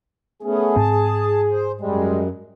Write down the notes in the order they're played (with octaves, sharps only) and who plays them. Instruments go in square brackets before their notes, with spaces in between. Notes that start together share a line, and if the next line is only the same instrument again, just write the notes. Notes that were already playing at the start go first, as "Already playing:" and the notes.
[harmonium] A3 B3 C#4 [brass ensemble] G#4
[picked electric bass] G#2 C4 [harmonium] A5
[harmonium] C5
[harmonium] F#2 [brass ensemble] G3 G#3